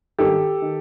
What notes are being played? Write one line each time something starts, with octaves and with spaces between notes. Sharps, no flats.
G#1 G2 D#3 G4 A4
D#3